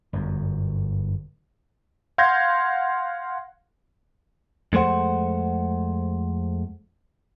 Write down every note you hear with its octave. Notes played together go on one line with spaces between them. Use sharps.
G1 F#2
F5 F#5 C6 G6 G#6 A#6
F2 G#3 A3 C5 F#5